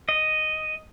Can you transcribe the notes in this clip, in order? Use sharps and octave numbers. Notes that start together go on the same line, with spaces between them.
D#5